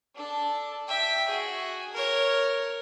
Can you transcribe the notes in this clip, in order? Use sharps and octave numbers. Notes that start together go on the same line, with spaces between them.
D4 A4
E5 G5
F#4 G#4
A#4 C#5